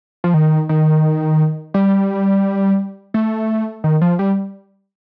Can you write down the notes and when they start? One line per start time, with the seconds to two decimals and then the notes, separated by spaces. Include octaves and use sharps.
0.24 F3
0.34 D#3
0.69 D#3
1.74 G3
3.14 A3
3.84 D#3
4.01 F3
4.19 G3